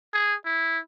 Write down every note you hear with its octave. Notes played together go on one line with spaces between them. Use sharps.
G#4
E4